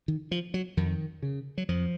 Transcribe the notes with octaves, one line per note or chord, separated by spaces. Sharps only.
D#3
F3
F#3
F2 D#3
C#3
F#3
F2 F3